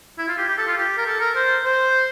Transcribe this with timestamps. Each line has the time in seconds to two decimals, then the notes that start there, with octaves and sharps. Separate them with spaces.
0.18 E4
0.28 F4
0.38 G4
0.48 G4
0.58 A4
0.67 F4
0.77 G4
0.97 A#4
1.06 A4
1.20 A#4
1.36 C5
1.64 C5